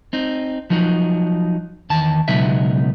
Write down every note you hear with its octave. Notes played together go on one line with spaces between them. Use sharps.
C4 D#4
F3 F#3 D#4
E2 D#3 A5
C#2 B2 F#3 B3 D#4 E5